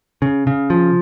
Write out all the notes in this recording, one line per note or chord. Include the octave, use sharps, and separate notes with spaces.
C#3
C#3
F3